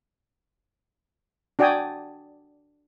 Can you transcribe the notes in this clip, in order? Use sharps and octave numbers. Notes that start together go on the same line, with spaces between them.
D4 F#4 D5 G5 G#5 D#6